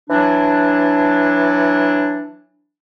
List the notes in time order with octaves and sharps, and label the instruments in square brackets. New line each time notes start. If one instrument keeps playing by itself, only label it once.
[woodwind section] E3 F#3 D4